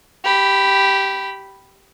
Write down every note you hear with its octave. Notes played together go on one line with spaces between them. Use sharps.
G4 B5